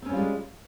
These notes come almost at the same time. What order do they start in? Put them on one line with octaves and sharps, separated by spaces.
C4 C#4 G3 F4 G#3